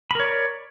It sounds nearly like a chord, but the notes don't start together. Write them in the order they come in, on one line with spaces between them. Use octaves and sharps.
B5 A#4 C#5 D5